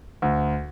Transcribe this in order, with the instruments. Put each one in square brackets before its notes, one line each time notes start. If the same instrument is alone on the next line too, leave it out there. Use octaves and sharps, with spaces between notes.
[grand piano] D2